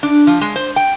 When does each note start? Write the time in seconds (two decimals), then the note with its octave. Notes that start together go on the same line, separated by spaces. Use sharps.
0.03 D4
0.27 F3
0.41 G#3
0.56 C5
0.76 G5